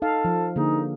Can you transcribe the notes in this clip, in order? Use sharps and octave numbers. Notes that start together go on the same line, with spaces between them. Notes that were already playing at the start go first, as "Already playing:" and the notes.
D#4 A4 F5
F3
D3 A#3 D#4 G#4